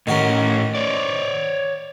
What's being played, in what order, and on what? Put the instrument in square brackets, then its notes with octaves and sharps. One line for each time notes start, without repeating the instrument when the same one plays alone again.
[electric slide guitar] A2 C#4 [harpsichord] D#3 F#4 A#4
[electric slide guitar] C#5 D5